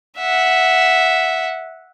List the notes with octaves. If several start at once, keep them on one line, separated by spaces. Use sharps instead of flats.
E5 F#5